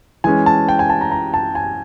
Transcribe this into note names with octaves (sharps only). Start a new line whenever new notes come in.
E3 G#3 C#4 G#5
A5
G5
G#5
A5
A#5
A#5
A5
G#5